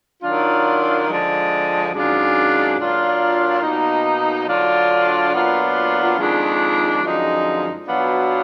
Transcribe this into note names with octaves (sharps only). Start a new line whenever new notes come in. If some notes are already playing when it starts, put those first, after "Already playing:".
D#3 F#3 D4 F4
D3 F3 G#3
F#2 D#3 G#3 D4 F4
A#2 F#3 D4 F4
B2 A#3 D#4
D3 F#3 D4 F4
A#2 F#3 B3 D4 F4
F2 D#3 G#3 D4
F#2 D3 F3 G#3 D#4
B2 F#3 B3 D4 F4